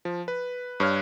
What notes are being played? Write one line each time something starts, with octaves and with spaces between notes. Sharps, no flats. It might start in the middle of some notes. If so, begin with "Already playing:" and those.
F3
B4
G2 C#5 F6